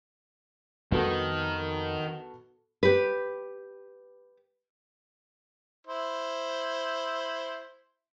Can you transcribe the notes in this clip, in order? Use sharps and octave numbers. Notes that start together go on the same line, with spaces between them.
F2 D#3 G3 B3 F#4 A4
G4 B4
E4 C5